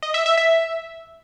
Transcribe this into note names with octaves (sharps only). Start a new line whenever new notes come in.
D#5
E5
E5
E5